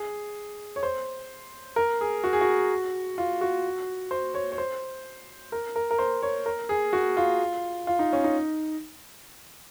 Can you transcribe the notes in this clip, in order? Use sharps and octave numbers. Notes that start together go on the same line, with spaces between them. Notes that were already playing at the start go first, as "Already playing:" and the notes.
Already playing: G#4
C#5
C5
A#4
G#4
F#4
G#4
F#4
F4
F#4
C5
C#5
C#5
C5
A#4
A#4
A#4
C5
C#5
A#4
G#4
F#4
F4
F4
D#4
C#4
D#4